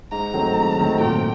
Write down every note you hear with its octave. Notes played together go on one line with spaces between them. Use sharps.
G#2 A#5
D#3 F#3 A3 C4
G#2
D#3 F#3 A3 C4
A#2 G5